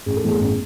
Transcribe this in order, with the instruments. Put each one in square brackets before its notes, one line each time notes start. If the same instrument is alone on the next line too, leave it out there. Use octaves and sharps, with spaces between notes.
[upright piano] A1 G#4
A4
A2 E3 B3 G#4
A1